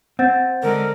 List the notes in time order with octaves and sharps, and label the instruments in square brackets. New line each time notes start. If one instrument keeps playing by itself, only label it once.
[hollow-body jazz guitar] C4 [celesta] F#5 G6 A6
[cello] D3 G#3 [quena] A#4